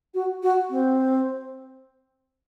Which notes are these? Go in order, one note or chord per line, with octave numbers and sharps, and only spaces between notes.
F#4
F#4
C4